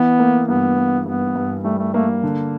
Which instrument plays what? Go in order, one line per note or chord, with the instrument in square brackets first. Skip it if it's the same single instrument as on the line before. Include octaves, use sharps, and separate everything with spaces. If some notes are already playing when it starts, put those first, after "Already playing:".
Already playing: [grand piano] E3 [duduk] B3
[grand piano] A#3
[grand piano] G2 [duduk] B3
[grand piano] A#3
[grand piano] G2 [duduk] B3
[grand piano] G2
[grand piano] G3 [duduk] A3
[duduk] A3
[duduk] A3 [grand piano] A#3
[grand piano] D3